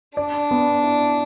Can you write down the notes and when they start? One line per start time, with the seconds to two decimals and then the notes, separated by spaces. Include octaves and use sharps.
0.17 D4 D5
0.51 B3
0.84 E4